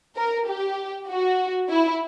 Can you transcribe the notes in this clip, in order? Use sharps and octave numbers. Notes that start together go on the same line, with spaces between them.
A#4
G4
F#4
E4